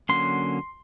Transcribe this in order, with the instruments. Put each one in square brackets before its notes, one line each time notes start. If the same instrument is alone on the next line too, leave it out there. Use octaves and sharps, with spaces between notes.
[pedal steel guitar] D3 F#3 A#3 C#4 C6